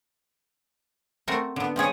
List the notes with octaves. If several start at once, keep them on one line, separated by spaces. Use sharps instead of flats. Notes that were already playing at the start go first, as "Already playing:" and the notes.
A3 C4 F#4 A#4
D3 B3
F3 G3 G#4 C#5